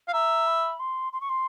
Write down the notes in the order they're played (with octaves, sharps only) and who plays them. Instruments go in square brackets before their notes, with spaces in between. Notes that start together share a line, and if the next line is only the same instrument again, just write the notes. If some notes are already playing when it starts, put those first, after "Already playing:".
[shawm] F5
[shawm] E5 [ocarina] A#5
[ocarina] B5
C6
C6
C#6
C6